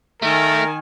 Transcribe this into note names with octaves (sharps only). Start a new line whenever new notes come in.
D#3 A3 A#4 G#5